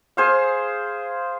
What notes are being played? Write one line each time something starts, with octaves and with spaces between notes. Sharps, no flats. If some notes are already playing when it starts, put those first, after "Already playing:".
G#4 C5 F5